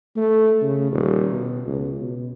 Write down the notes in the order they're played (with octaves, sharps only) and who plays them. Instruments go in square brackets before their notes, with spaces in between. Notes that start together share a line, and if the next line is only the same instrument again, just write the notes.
[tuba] A3
C#3
D#1
B2
C#2
B2